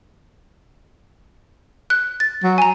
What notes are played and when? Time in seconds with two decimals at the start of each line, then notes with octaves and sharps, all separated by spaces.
1.90 F#6
2.20 A6
2.43 F#3
2.58 G#5 A#5